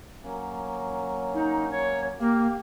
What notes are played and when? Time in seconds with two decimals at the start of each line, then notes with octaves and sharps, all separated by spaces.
0.23 F#3 A#3 C#4
1.35 D#4
1.71 C#5
2.20 A#3 G4 F5